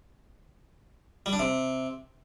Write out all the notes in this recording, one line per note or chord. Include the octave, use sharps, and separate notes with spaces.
G3
D4
C3